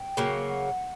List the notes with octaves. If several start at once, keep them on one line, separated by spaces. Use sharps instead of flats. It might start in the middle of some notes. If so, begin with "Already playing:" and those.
Already playing: G5
C#3 F#3 A#3
F#5